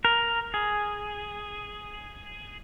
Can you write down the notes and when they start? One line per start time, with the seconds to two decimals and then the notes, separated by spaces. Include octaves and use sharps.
0.05 A#4
0.54 G#4